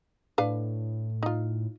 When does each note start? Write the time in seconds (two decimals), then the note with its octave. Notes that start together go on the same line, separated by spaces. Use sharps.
0.38 A2 D4 B4 F5
1.23 D#4 F4